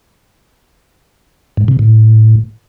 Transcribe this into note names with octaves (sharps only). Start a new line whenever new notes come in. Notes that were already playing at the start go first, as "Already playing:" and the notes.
G#2
C3
A2